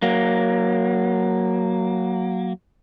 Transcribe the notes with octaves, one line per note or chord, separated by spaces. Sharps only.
F#3 A#3